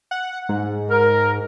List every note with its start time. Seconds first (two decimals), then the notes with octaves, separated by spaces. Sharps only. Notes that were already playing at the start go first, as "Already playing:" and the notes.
0.11 F#5
0.49 G#2
0.91 A#4